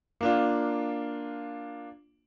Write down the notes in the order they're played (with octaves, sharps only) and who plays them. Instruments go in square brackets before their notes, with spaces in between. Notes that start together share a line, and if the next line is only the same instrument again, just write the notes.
[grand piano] A#3 D4 F4